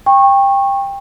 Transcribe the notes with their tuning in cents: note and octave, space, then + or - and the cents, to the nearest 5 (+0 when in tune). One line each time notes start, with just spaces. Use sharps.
G5 +20 C#6 -20